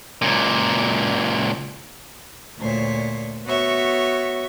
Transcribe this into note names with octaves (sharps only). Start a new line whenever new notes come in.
C#2 A#2
D2 A#2 C5 C#5
B3 F#4 C#5 E5